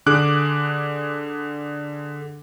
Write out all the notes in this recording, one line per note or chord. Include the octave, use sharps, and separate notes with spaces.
D3 G#4 D6 F#6